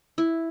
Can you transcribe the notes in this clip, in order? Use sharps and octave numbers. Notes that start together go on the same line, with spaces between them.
E4